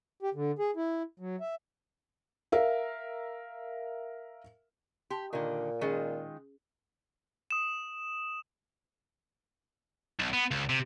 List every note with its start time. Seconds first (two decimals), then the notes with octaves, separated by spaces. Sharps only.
0.22 G4
0.34 D3
0.59 G#4
0.76 E4
1.19 F#3
1.40 E5
2.52 A#4 E5 F5
5.10 G4 A5 C6
5.33 A#2 D3 D#3
5.81 D#3 G#3 C#4 F4 G#4
7.51 D#6 E7
10.19 B1
10.34 B3
10.51 C#2
10.69 C3